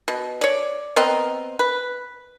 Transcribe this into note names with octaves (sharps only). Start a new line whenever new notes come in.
B2
C#5 D5
B3 C4 A#4 D#5
B4